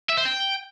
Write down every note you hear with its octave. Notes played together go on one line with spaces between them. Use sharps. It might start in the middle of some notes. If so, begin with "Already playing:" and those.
E5
C5
G5